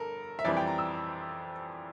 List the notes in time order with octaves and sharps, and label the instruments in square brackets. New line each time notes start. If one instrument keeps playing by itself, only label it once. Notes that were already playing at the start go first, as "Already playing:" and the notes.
Already playing: [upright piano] G1 G2 A4 A#4
E5
F2 E3 G3 C4 D5
G5
A#5
E6